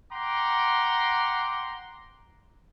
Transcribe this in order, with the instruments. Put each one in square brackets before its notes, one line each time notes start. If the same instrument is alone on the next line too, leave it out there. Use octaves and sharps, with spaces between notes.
[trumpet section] F#5 G5 A#5 C6 D6